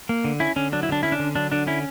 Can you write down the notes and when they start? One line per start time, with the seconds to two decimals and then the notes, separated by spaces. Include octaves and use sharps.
0.09 A#3
0.24 D3
0.40 C#4 E4
0.56 D3 C#4
0.72 F#3 D4
0.83 E4
0.89 D3 D4
1.03 C#4 E4
1.12 D4
1.19 D3
1.35 F#3 D4
1.52 D3 D4
1.67 C#4 E4